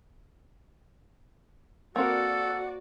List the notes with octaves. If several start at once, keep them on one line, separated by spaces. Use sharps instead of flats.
A#3 C4 F#4 A4 A#4 D5 F#5